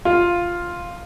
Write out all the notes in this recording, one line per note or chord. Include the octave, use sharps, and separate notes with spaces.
F4